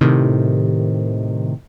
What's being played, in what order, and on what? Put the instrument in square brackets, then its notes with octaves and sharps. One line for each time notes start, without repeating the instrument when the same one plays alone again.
[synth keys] A2 C3 D#3